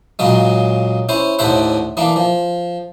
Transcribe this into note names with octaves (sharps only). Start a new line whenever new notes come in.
A#2 C#3 F#3 G#3
C#4 E4 C5
D#2 A2 D3 C5 E5 F#5
E3 A#3 D4
F3